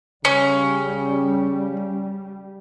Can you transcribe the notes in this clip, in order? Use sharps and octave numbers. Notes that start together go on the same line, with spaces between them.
C#3 G3 C#4